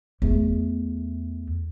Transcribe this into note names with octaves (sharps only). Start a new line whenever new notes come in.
E2 A3